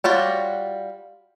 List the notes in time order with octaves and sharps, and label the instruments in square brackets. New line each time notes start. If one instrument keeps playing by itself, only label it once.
[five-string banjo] G3 F4 F#4 C#5